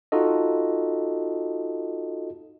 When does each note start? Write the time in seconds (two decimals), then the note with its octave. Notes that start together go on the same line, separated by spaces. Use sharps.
0.12 D#4 F4 F#4 A4 D#5